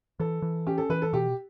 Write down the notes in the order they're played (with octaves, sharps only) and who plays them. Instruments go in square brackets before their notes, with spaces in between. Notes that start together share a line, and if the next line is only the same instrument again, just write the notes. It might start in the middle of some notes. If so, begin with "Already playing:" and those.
[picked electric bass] E3 [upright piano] A4
[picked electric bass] E3
[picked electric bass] C#4 [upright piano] G4
[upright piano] A4
[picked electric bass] E3 [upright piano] B4
[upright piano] A4
[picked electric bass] B2 [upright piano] G4